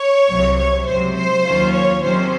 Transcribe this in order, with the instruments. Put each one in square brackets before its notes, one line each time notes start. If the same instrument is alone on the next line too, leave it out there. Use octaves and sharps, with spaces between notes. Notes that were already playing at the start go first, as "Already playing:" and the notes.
Already playing: [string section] C#5
C2 C3 F#3
C#5
C#2 C3 F#3 C5
C5
D#2 D#3 F#3 C#4 F4
C#5
C3 D#3 F#3 C#4 C5